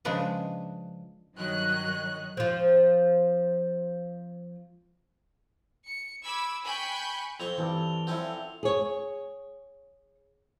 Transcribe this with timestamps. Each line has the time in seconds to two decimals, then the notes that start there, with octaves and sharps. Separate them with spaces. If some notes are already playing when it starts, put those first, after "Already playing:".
0.05 C#3 F3 G#3 D4 B4
1.36 G2 D#3 F#3 C#5 D#5 F#6
2.37 F3 C4
5.87 C#7
6.24 B5 D6 E6 G#6
6.64 G5 G#5 B5 C#6 F#6 G6
7.40 F2 C4 C#6 F7 G7
7.58 G2 E3 C4 A4 D5
8.07 F3 C4 C#4 E4 A4 F#5
8.63 G#4 C#5